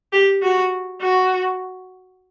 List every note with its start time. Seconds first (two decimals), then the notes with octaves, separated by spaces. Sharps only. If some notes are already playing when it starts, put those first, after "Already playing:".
0.13 G4
0.42 F#4
1.01 F#4